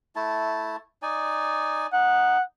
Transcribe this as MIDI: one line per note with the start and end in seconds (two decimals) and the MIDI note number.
0.16 0.76 57
0.16 0.76 64
0.16 0.76 81
1.02 1.87 63
1.02 1.87 74
1.02 1.87 80
1.93 2.37 63
1.93 2.42 78